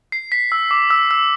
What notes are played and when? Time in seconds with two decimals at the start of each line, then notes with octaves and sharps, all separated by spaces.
0.12 C7
0.32 B6
0.52 E6
0.71 D6
0.90 E6
1.11 E6